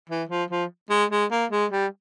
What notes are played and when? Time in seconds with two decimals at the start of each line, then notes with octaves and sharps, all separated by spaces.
0.10 E3
0.29 F3
0.50 F3
0.90 G#3
1.11 G#3
1.31 A#3
1.51 G#3
1.72 G3